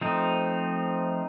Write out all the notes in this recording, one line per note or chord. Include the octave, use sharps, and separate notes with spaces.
F3 A3 C4 D#4